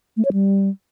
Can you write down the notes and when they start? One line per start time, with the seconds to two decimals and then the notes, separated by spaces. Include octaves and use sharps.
0.17 A3
0.25 C#5
0.33 G3